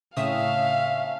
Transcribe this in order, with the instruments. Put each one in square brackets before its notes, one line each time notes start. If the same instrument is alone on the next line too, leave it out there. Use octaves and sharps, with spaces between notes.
[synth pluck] A2 C#3 D#6 [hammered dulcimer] A3 C4 C#4 [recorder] E5 [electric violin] F5